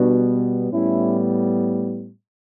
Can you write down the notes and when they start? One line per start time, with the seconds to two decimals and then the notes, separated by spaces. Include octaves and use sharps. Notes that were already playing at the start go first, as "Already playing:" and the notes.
Already playing: B2 G3 B3 D4 F#4
0.71 A2 G3 B3 C#4 E4